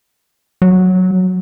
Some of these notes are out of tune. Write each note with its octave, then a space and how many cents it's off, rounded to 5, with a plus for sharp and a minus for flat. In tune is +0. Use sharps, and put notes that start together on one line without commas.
F#3 -5